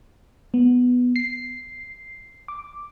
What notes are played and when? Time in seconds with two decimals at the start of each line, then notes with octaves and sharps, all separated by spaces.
0.54 B3
1.16 C7
2.48 D6